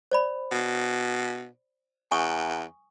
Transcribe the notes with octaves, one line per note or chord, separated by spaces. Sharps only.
C5 D5 B5
B2
E2 G#5 C#6 D#6